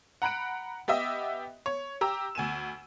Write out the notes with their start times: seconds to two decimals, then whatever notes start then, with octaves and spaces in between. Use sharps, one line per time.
0.22 F#5 A#5 B5 F#6 D7
0.88 B3 G4 D#5 E5
1.66 C#5
2.01 G4 A#5 E6
2.35 D2 G#5 D#7 E7